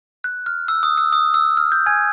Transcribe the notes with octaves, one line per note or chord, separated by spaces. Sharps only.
F#6
F6
E6
D#6
E6
D#6
E6
F6
G6
G#5 G#6